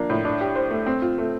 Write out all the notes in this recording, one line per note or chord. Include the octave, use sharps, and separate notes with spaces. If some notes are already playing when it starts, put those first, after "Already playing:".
Already playing: F3 A#3 D4
A2
D4
G4
C5
A3
C4
F4
A3